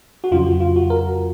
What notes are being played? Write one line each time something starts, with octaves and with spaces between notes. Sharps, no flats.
F#4
F2 C#3 F#3 F4
F#4
F4
F#4
A#4